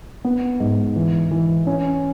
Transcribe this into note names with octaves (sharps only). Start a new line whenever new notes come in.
B3
G#2
E3
E3
C#4